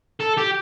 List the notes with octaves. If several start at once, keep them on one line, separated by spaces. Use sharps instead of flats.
A4
G4